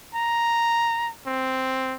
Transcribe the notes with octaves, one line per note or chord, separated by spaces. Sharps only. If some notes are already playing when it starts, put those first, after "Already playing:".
A#5
C4